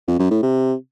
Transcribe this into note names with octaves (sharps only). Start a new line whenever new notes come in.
F2
F#2
A2
C3